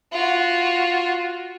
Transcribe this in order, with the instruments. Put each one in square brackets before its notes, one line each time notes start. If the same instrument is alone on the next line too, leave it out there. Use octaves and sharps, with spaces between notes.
[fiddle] F4 F#4